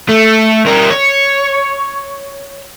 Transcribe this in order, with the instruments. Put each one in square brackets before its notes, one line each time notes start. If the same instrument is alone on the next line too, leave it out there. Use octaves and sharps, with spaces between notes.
[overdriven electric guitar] A3
G3 A#4
C#5